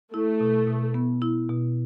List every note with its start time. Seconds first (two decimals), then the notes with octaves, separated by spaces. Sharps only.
0.13 A3 E4
0.40 B2
0.67 B2
0.94 B3
1.22 E4
1.49 B2